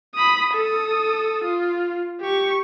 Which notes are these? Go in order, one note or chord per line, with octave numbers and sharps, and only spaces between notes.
B5 D#6
A4 D#6
F4
G4 C#6